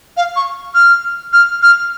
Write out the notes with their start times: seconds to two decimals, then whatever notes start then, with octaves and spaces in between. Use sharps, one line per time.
0.17 F5
0.36 C#6
0.75 F6
1.33 F6
1.62 F6